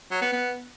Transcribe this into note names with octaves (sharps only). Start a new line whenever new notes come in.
F#3
B3
B3